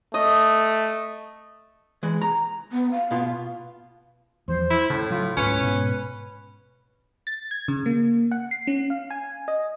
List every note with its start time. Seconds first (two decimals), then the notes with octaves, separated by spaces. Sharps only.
0.14 A3 D#5
2.03 E3 G#3
2.22 A#5
2.72 B3
2.92 F5
3.11 B2 B3 F4
4.48 E2 F3 C5
4.70 E4
4.90 A2 C#3
5.10 F#3 F4
5.37 C#2 G#2 C#4 B4
5.61 G#2 B2
7.27 A6
7.51 G#6
7.68 C#3
7.86 A#3
8.31 F#5
8.51 C7
8.67 C#4
8.90 F5
9.10 G#5
9.48 D#5